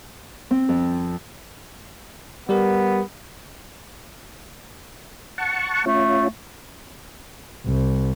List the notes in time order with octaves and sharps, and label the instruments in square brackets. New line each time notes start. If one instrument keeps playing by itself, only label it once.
[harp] C4
F2
[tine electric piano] G3 G4 A#4 [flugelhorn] B3
[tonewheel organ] F#5 A5 C#6
[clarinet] A3 [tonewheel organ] C#4 F4
[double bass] C2